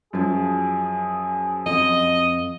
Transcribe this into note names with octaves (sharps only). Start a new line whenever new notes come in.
F#2 F3 G#4
F2 D#5